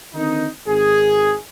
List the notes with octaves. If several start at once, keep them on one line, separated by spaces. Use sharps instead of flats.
D3 D#3 C4 D#4
G#1 G#4